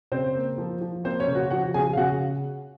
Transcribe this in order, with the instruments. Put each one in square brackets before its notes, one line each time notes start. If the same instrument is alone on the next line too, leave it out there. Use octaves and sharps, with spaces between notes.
[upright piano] C#3 C4 C5
A#3
F3
F3
A#3 C4 C5
C#4 C#5
C#3
F#4 F#5
F3 F#4 F#5
C#3 G#4 G#5
F5
C#3 F#4 F#5